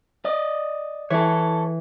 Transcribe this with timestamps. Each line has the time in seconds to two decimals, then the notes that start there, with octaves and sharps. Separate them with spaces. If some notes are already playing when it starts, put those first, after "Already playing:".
0.25 D5 D#5
1.10 E3 A4 C#5